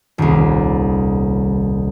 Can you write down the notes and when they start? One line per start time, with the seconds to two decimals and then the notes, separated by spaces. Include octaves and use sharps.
0.18 D#1 C2